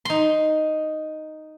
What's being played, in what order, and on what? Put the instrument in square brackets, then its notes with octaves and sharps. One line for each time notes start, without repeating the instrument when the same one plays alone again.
[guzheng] D#4 C6